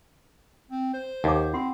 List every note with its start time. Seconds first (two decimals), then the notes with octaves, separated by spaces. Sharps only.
0.70 C4
0.93 C5
1.24 D#2 F#5 D6
1.53 C4 F4 F#5 C6